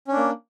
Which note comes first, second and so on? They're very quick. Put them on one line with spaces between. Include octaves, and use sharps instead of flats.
C#4 D4 A#3